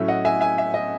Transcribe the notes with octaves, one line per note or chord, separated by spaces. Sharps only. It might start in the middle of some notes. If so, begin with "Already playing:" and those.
Already playing: A2 F#3 A3 C#4 E5
D#5 F#5
E5 G#5
E5 G#5
E5
D#5